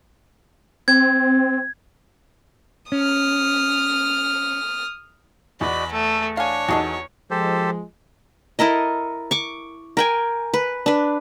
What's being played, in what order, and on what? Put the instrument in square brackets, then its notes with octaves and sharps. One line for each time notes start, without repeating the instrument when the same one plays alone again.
[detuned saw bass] C4 [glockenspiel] G#6
[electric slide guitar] C#4 [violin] D#6 F6
[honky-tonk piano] E2 [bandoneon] F#4 D5 D#5 [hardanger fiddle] B5
[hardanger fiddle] A3 [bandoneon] A4
[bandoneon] D4 [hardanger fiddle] C#5 [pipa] F5 G#5
[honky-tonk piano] E2 D#4 [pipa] F#4 G#4 A4
[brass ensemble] F3 G#3 [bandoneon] G4 A4 C5
[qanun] E4 A4 A#4 D#5
C#6 D6
A#4 G5 G#5
B4
D4 B4